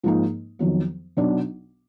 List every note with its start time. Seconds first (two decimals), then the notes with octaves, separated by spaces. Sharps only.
0.03 G#2 F3 A#3 D#4
0.59 F2 D#3 F#3 B3
1.17 B1 B2 F#3 B3 D4